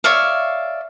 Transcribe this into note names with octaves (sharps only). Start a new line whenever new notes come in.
C#5 D5 E5 F5